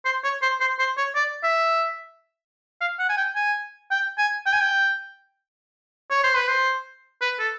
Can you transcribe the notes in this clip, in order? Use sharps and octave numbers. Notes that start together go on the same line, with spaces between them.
C5
C#5
C5
C5
C5
C#5
D5
E5
F5
F#5
G#5
G5
G#5
G5
G#5
G5
G#5
G5
C#5
C5
B4
C5
B4
A4